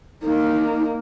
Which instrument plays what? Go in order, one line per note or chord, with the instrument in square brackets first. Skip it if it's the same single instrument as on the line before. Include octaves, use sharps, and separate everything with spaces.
[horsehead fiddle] A#3 D#4